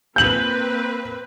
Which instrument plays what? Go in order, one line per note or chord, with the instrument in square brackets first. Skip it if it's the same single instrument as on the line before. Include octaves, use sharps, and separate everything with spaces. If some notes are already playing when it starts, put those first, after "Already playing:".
[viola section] A#3 C4 B4 [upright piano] G6 F#7